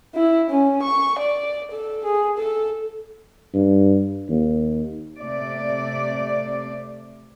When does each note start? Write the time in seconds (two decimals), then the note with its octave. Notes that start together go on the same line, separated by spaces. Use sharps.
0.15 E4
0.50 C#4
0.82 C#6
1.19 D5
1.71 A4
2.04 G#4
2.38 A4
3.54 G2
4.29 D#2
5.18 C3 A3 D5